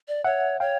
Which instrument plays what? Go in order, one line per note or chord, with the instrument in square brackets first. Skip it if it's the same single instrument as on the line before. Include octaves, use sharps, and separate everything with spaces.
[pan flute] D5
[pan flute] C#5 [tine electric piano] E5 F#5
[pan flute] C#5 [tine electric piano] F5 G5